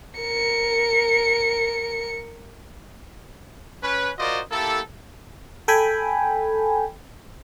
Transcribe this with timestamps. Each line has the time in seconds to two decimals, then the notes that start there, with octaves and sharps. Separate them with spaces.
0.19 A#4 C#7
3.82 C#4 B4
4.19 F4 F#4 A#4 C5 D5 D#5
4.51 A#3 E4 G4 A4
5.68 A4 G5 G#5 B5